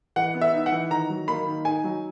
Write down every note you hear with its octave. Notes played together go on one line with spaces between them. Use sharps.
E3 F#5
B3
E5
D#4
F#5
E3
D#3 A#5
F#3
A#3 B5
D#3
D#4 G#5
F#3